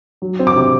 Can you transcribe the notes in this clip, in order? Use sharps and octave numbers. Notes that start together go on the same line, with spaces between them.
F#3
C4
D6
C3